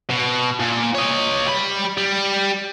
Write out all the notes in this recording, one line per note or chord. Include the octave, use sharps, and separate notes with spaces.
B2
A#2
C#5 D#5
G3 B5
G3